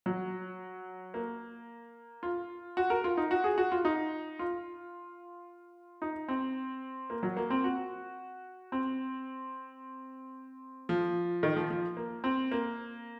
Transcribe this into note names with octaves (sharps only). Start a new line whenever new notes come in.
F#3
A#3
F4
F#4
A#4
F4
D#4
F#4
G#4
F#4
F4
D#4
F4
D#4
C4
A#3
F#3
A#3
C4
F#4
C4
F3
D#3
F3
F3
A#3
C4
A#3